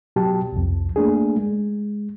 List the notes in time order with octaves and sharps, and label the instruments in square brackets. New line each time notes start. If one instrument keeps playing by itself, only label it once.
[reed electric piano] B2 F#3 G4 A5
C2 F2
A3 A#3 D4 G#4
G#3